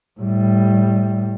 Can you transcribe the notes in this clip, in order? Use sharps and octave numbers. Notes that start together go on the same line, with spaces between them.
A2 G3